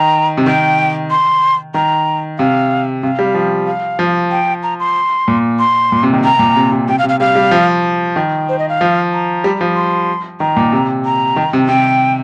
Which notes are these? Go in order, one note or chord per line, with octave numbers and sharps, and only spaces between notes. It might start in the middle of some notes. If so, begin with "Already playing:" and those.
Already playing: D#3 A#5
C3
D#3 G5
C6
D#3 A#5
C3 F5
C3 F5
G3
F3
F5
F3
G5
A#5
C6
A#2
C6
A#2
C3
D#3
C3 A#5
A#2
C3
C3
C3 G5
F5
C3
F5
G3 F5
G3
F3
D#3
C5
D#5
F5
F3
A#5
G3
F3
C6
D#3 A#5
A#2
C3
A#5
D#3
C3
C3 G5